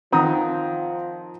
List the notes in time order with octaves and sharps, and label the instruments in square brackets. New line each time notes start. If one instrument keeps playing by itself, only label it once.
[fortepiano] D#3 C4 [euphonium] F3 [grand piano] F#5 A#5 D#6